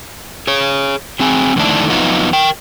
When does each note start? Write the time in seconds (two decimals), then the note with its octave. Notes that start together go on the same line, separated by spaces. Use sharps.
0.47 G#4 C#5
1.20 F#3 C4 G#4 G#5
1.56 F2 D3 D#3 A3 D4 E4
1.89 F2 F#3 B3 D#4 F4
2.33 A#4 G5